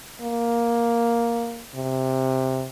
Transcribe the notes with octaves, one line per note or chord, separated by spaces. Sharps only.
A#3
C3